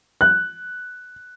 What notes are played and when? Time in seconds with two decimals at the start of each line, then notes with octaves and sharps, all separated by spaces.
0.21 F#6